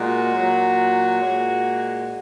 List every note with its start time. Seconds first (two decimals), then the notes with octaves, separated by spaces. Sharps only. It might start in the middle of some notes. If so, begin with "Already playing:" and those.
Already playing: A#2 G#3 F#4
0.30 A#2 F#3
1.20 A#2 G#3